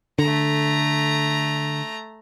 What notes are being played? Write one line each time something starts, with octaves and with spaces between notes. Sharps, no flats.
D3 A3 A#5